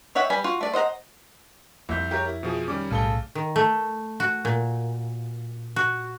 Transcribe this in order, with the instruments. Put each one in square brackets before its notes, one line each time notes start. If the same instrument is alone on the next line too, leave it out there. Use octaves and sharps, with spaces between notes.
[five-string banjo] D#4 C#5 E5 F#5 G5
G3 B4 G#5 B5
F4 F#4
A3 D5
C5 D#5 F#5 A#5
[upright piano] C2 E5 G6 [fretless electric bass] F2
[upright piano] G4 A#4 C#5
E4
[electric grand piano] B2 F3 G#4
[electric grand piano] D#3 G3 C#4 [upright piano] D6
[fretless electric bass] B1 A2 [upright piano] C#3 A4 G7
[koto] D#3
A3
F#4
A#2
F#4